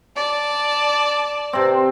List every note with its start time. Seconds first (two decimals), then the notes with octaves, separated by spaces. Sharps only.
0.15 D5 A5
1.53 C3 C4